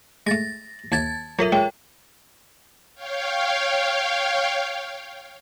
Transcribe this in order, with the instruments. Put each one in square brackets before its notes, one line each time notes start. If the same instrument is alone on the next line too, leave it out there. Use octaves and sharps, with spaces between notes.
[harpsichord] G#3 A3 [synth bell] A6 A#6
[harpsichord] D#2 E5 [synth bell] A5 G#6 A6
[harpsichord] F#3 D#6 [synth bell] F4 A4 E5 [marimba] A#4
[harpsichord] G#3 [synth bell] C#5 [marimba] G5
[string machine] C#5 F5 G5